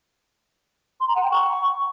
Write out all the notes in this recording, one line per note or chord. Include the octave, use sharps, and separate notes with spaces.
C6
A#5
F#5
G5
C#6